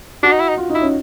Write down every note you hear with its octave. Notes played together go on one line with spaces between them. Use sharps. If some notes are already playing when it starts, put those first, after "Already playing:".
D4 F#4
D#4
E4
D#4
F4
D#4
E4
C#4